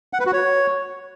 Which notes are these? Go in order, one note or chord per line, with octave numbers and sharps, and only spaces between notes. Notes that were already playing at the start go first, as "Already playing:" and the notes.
F#5
B4
F#4
C#5